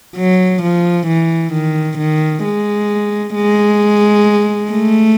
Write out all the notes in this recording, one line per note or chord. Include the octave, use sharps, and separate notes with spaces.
F#3
F3
E3
D#3
D#3
G#3
G#3
A3